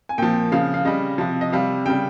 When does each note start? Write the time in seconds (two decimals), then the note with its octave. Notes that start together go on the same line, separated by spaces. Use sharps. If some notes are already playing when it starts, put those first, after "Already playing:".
0.09 G#5
0.18 A#2 F3 G5
0.52 C#3 F3 F5
0.74 F5
0.85 C#3 G3 D#5
1.18 C3 F3
1.41 D#5
1.52 C3 G3 F5
1.86 C#3 G3 G5